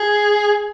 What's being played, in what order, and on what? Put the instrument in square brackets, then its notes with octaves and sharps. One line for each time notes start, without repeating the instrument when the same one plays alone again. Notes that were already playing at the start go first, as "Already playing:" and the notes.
Already playing: [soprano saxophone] G#4